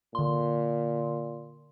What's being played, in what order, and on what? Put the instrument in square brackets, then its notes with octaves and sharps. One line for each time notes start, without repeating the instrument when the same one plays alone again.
[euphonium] A#2 [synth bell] D3 C6